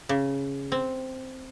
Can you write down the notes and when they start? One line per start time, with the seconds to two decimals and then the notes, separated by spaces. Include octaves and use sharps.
0.09 C#3
0.72 C4